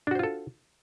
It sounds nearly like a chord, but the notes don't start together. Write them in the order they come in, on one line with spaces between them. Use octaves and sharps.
D4 F#4 C5 F4 A4